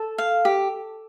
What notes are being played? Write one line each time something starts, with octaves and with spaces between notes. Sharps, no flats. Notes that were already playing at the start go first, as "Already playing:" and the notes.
Already playing: A4
F5
G4